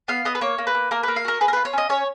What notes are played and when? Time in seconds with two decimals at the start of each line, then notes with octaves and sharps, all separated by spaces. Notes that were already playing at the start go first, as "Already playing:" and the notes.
0.08 B3 F5
0.25 B3 D#5
0.35 B4
0.41 A#3 C#5
0.58 A#3
0.67 B4
0.75 A#3
0.91 A#3 A#4
1.03 A#3 B4
1.16 F5
1.25 F#4 A#4
1.41 G#4 B4
1.48 A#4
1.53 F4 B4
1.65 C#5
1.73 C#4 D#5
1.89 C#4 C#5